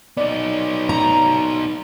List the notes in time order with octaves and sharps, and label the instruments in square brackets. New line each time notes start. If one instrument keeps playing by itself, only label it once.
[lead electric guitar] B3 D#4 [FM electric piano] D5
[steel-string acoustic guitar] A#5